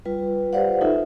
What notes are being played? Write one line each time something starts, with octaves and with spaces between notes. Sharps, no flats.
G3 F4 B4
G4 B4 C5 D5 F5 F#5
D#4 F4 A4 E5